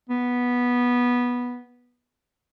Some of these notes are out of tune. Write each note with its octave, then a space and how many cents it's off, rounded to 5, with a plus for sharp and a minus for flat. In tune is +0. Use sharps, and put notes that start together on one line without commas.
B3 -10